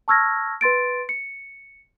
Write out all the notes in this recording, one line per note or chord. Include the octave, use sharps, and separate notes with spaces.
A5 C#6 E6 F6 G#6 A#6
B4 C6 A6 D7
C#7